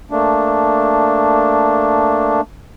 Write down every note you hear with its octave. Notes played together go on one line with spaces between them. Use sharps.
A3 A#3 D4